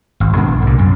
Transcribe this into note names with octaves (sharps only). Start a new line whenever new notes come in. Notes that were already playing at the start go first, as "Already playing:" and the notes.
G#1
G#2 B3 D4
A#1
C2 A#2
F#2